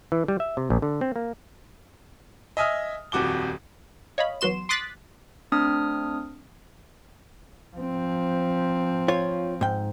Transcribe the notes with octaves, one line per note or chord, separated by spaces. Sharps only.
E3
G3
E5
C3
A#1
D3
C4
A#3
D#5 E5 G#5 D#6 F6
D#1 F2 F#4 D6 G7
C#5 D#5 F5 B5
E2 F#3 B3 F#4 C6 E7
C6 D6 D#6 F#6 A6 B6
A3 C4 D4 D#6 F6
F3 C4
F4 C#5
G#2 G5